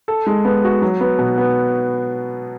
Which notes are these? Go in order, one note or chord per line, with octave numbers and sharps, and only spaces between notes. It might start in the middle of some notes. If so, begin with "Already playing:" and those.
A4
G#3
B3
F#4
F#3
B3
B2
B3